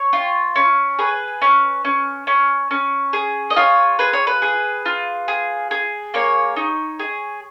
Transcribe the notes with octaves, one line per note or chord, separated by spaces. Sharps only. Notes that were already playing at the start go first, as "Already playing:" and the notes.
Already playing: C#5
F4
C#4
G#4 B4
C#4
C#4
C#4
C#4
G#4
D#5
F4 C#5
G#4 B4
C#5
B4
G#4
F4
G#4
G#4
A#3 C#5
D#4
G#4